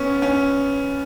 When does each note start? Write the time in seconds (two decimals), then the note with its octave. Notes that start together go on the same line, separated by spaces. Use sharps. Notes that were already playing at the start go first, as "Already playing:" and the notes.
Already playing: B3 C#4
0.22 C#4